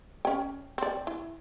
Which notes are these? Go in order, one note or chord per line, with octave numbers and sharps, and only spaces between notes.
C#4 G5
C4 D5
E4